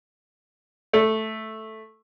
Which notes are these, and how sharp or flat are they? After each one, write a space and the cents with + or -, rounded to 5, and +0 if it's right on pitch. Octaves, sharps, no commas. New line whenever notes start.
A3 -5